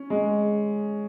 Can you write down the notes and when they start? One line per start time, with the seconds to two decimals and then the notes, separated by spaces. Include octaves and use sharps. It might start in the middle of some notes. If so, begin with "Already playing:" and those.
Already playing: C#4
0.10 G#3